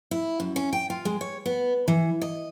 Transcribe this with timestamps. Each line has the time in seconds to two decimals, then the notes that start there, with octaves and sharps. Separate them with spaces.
0.11 E4
0.40 F#2
0.56 C#4
0.73 G5
0.90 F4
1.05 G#3
1.21 C#5
1.46 B3
1.88 E3
2.21 D#5